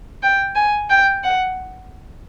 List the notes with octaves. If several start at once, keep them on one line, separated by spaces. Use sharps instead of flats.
G5
G#5
G5
F#5